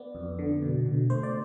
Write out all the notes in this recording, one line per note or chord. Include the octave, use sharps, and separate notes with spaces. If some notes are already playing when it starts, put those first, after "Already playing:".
Already playing: B3 D5
F2
D3
B2
B2
A3 C5
D5